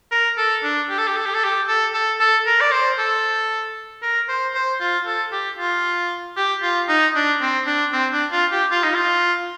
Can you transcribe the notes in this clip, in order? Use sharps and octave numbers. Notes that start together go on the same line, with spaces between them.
A#4
A4
D4
G4
A4
G4
A4
G4
A4
G4
A4
A4
A4
A#4
D5
C5
A4
A#4
C5
C5
F4
A4
G4
F4
G4
F4
D#4
D4
C4
D4
C4
D4
F4
G4
F4
D#4
F4